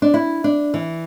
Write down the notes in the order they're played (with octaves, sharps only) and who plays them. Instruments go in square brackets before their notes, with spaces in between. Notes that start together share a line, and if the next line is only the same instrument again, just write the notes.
[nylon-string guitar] D4
E4
D4
E3